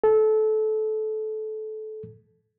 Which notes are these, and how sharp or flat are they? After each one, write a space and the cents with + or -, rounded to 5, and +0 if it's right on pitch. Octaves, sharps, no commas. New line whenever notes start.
A4 -20